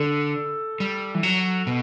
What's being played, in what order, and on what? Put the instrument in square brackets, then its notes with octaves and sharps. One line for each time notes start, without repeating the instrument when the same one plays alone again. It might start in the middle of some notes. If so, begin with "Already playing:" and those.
Already playing: [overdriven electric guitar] D3 [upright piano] A4
[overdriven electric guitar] G3
E3
F#3
B2